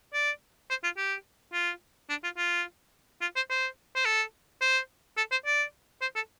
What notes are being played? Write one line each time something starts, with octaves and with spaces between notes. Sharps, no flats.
D5
C5
F4
G4
F4
D4
F4
F4
F4
C5
C5
C5
A4
C5
A4
C5
D5
C5
A4